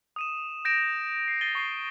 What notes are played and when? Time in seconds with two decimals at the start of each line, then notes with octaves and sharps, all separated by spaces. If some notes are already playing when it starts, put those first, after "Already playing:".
0.16 D#6 D#7 E7
0.65 G6 A#6 D7 E7 F7
1.28 C7
1.41 A6 C7 D#7 G7
1.55 C#6 C7